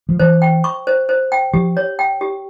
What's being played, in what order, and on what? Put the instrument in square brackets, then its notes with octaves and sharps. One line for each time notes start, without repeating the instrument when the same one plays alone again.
[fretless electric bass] F3
[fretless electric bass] E3 [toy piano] C5
[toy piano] G5
C#6
C5
C5
G5
[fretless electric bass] F3 [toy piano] G4
[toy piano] C#5
G5
G4